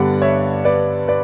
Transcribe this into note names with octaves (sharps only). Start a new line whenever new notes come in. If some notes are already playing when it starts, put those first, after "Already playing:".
Already playing: G2 D3 G3 B3 D5 F#5
C#5 E5
B4 D5
B4 D5